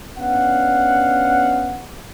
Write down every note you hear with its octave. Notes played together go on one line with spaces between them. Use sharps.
B3 C#4 D4 F5 F#5